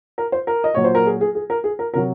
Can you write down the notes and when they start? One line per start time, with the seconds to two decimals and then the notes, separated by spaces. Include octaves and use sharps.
0.18 A#4
0.32 C5
0.47 A#4
0.64 D#5
0.74 A#2 F#3 C#5
0.84 C5
0.95 A#4
1.06 G#4
1.21 G#4
1.35 G#4
1.50 A#4
1.64 G#4
1.79 A#4
1.94 C3 F#3 A#4